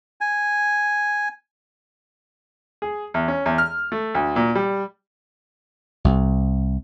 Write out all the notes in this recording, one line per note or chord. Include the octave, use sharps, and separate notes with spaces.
G#5
G#4
E2
C#4
E2
F6
A3
D2
A#2
G3
C2